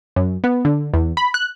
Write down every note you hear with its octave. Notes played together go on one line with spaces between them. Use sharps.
F#2
B3
D3
E2
B5
F#6